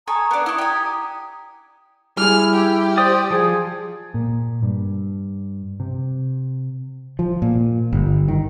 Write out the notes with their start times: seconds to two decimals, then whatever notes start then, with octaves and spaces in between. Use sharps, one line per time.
0.08 A4 G#5 A#5 C#6 D#6
0.31 B3 D4
0.46 E4 C#6
0.58 G4 G#5
2.17 G3 E4 G#4 F6
2.54 G4
2.97 C5 D5 D#6
3.30 F3 G#4
4.14 A#2
4.63 G2
5.80 C3
7.19 F3
7.42 A#2
7.93 G1
8.28 D#3